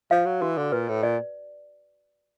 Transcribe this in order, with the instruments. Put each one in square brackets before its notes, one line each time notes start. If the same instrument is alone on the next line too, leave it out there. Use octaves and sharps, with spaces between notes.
[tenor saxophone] F3 [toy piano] F5
[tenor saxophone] F#3
[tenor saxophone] E3 [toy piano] F#4
[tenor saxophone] D3
[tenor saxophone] A#2 [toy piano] B4
[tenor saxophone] A2
[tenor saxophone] A#2 [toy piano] D5